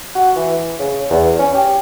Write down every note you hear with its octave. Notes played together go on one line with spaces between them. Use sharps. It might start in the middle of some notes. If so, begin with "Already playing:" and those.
F#4
E3
C#3
E2
C#4
G4